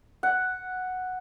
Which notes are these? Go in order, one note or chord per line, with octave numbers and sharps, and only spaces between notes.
F#5